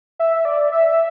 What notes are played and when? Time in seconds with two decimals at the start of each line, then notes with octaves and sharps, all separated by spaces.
0.19 E5
0.45 D5
0.72 E5